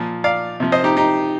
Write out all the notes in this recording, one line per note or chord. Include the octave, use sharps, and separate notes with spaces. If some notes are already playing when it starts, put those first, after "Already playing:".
Already playing: A#2 F3
D5 F5
C3 F3
C5 D#5
D#4 G4
D#4 G4